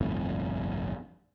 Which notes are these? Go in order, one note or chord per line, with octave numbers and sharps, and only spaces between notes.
G1 C2 F2 A2